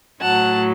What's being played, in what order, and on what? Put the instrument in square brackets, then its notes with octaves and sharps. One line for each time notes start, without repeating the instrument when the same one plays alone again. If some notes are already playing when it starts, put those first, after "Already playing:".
[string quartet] A2 F#3 F#5 A5